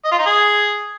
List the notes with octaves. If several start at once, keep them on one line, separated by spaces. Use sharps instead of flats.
D#5
F4
D#4
G#4